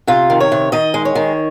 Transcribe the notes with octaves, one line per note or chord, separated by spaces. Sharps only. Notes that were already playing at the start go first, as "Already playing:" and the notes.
C3 F4
D#3
C#5
C3
D#3 D#5
G#3
C#5
D#3